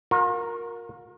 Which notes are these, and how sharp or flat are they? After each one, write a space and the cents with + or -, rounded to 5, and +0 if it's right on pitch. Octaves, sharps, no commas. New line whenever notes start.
F4 +45 A#4 +0